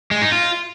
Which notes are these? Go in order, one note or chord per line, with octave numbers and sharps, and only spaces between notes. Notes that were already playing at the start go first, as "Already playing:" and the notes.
G#3
D#4
F4